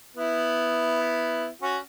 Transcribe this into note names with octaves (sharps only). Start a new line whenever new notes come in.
B3 E4
C#4 F#4